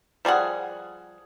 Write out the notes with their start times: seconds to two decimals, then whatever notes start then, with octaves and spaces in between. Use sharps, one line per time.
0.25 F3 G3 G#4 F#5